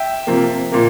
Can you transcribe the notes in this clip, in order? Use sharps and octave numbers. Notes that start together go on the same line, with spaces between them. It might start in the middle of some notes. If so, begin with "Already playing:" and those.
Already playing: E5 G5
C3 F3 A#3
A#2 F3 A#3